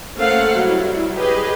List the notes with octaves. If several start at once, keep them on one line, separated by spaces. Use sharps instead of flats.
A3 A#3 C#4 C5 F5 F#5
F#3 G3 E4
G4 G#4 B4 D#5